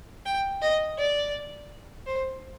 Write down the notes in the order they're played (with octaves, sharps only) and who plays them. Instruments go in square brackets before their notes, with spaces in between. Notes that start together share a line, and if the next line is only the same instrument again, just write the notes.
[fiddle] G5
D#5
D5
C5